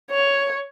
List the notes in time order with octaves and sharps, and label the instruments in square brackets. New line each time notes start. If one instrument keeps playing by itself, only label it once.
[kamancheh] C#5